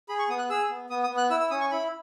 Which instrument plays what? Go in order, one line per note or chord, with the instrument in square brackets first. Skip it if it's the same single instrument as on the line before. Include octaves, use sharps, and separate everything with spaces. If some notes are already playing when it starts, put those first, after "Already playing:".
[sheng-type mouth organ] G#4 B5
C#6
B3 D#6
F#6
G#4 E6
B3
B3 D#6
D#6
B3
F#6
E4 E6
E6
C#4 D#6
C#6
E4 B5